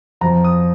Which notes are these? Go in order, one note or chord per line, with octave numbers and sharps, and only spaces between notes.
F2 F3 A#5
D#6